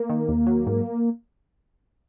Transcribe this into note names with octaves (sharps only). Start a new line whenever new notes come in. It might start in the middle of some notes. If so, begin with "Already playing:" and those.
Already playing: A#3
D#3
D#2
F#3
G#2